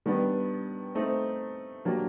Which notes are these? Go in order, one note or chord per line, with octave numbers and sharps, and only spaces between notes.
D#3 G3 B3 D4
A3 C4 D#4
F#3 A#3 D4 G4